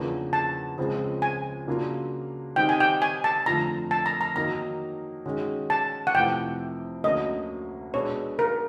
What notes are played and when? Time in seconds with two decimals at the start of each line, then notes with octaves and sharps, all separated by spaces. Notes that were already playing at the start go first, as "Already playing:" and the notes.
Already playing: E2 C#3 F3 A#3 D4
0.33 A5
0.78 C#2 C#3 F3 G#3 C4
1.22 G#5
1.67 C#3 F#3 A#3 D4 F4
2.56 D#3 G3 C4 D#4 G5
2.69 G#5
2.80 G5
3.02 G#5
3.24 A5
3.46 F2 D3 F3 A3 A#5
3.91 A5
4.06 A#5
4.21 A#5
4.36 D#3 F#3 A#3 D#4 A#5
5.26 D#3 G#3 C#4 F#4
5.70 A5
6.07 F#5
6.14 F2 C3 E3 A3 G5
7.04 D2 D3 F#3 A#3 C#4 D#5
7.94 B2 G#3 B3 D4 C#5
8.39 A#4